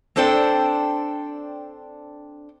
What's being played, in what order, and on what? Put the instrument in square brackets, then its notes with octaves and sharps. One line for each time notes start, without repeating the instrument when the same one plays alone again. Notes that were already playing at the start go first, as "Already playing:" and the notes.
[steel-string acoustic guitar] C4 D4 A4 C5 D5 G5